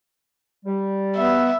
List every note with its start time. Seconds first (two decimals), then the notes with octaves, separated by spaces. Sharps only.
0.65 G3
1.17 B3 E5